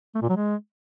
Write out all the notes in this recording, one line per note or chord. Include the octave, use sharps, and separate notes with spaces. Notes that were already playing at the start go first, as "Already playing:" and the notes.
A3
A#2
F#3
G#3